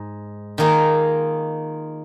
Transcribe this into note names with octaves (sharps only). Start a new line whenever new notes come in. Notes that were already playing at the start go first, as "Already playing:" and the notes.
Already playing: G#2
D#3 A#3 F4 G#4